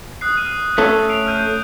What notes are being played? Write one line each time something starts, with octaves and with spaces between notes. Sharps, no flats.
D#6 F#6 C7
F6 D#7
A3 C#4 A4
C7 D7 F7
F6 G6 D#7